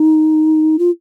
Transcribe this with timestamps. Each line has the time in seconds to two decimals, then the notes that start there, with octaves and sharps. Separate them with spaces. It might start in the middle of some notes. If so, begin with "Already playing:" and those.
Already playing: D#4
0.79 F4